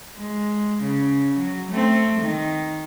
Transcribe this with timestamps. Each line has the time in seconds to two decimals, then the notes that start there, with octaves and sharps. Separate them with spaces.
0.17 G#3
0.83 C#3
1.38 F#3
1.71 A3 C4
2.21 D#3